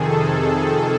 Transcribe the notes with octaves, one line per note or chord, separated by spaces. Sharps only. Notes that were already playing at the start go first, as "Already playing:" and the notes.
Already playing: F2 C3 D#3 G#4 A4